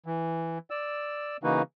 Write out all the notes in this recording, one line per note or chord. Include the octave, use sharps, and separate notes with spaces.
E3
D5 E6
C#3 E3 A#3 D#4 F#4 B4